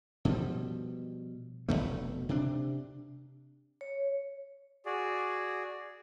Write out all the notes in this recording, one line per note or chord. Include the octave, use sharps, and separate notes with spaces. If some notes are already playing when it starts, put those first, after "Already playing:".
B2 F3 G3
F1 F2 B2 A3
C3 D4
C#5
F#4 G#4 D5